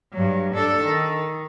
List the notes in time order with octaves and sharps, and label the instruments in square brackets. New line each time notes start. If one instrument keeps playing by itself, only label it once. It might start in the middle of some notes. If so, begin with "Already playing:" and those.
[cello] G2 F#3
D4 A4
D#3